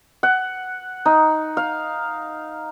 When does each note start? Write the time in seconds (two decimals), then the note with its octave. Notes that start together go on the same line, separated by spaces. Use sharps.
0.23 F#5
1.06 D#4
1.57 F5